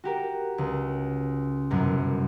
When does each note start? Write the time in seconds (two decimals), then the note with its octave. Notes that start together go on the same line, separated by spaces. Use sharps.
0.04 F#4 G4 A#4
0.58 C#2
1.70 G1 C2 F#2